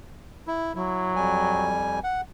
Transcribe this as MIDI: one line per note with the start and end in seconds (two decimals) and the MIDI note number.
0.47 0.73 64
0.76 1.78 54
0.76 1.14 64
1.16 1.99 41
1.16 1.99 55
1.16 1.99 80
2.04 2.21 78